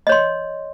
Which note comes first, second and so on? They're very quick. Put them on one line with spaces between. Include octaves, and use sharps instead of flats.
D#5 C#5 C6